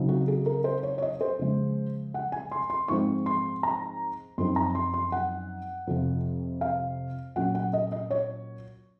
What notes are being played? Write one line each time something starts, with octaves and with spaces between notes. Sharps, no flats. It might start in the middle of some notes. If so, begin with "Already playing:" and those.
Already playing: C#3 F#3 C4 D#4
F#4
G#4
A#4
C5
C#5
C#5
D#5
C5
C#3 F3 G#3
F#5
G#5
C6
C6
G#2 F3 G#3 C4 C#6
C6
A#5
F#2 F3 C4 D#4 C6
A#5
C6
C6
F#5
F2 C3 F3
F5
A#2 F#3 C#4 F#5
F#5
D#5
D#5
C#5